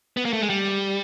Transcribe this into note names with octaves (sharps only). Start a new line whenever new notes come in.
B3
A#3
A3
G#3
G3